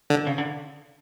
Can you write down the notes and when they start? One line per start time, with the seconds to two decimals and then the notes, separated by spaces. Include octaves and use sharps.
0.10 D3
0.27 C#3
0.38 D3